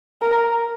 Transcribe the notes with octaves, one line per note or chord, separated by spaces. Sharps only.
A#4